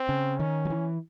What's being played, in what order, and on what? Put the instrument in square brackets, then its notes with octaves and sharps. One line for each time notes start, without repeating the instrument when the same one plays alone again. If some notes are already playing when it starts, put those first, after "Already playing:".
Already playing: [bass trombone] C4
[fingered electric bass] C#3
[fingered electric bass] D#3 [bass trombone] C#4
[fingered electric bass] F#3
E3